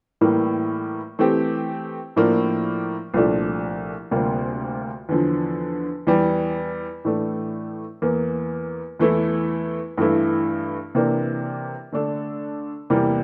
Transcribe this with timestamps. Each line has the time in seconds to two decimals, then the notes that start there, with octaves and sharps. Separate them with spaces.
0.21 A2 E3 G3 A#3
1.19 E3 A3 C4 G4
2.16 A2 F3 A#3 D4
3.14 C2 A#2 F3 A3 D4
4.11 D2 C3 G3 A#3 F4
5.09 E2 D3 F3
6.07 E2 E3 G3
7.05 A2 E3 A3 D4
8.02 E2 E3 A#3
8.99 E2 E3 A3 E4
9.98 G2 E3 A3 E4
10.95 C3 E3 A#3 D4
11.92 D3 A3 D4 A4
12.90 E2 C3 E3 G3 A#3